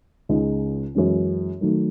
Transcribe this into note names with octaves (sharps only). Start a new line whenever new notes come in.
C#2 C#3 G#3 D#4
F#2 E3 G#3 C#4
D#3 F#3 A3